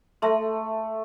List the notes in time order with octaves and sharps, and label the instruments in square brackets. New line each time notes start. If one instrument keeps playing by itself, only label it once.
[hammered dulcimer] A3 [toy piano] A4 E5 A5 C6